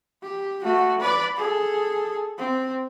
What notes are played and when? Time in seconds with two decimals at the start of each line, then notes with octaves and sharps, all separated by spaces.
0.22 G4
0.64 A3 F#4
1.00 B4 D5
1.37 G#4 A4
2.38 C4